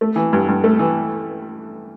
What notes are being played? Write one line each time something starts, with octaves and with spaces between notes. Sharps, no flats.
A3
E3
G2
G2
A3
E3